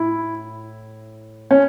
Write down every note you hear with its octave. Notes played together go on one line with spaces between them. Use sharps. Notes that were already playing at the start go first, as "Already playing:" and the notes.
Already playing: A2 E4
C#4